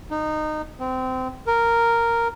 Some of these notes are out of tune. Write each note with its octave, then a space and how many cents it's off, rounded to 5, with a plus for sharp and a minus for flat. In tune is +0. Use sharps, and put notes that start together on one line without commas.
D#4 -20
C4 -25
A#4 -5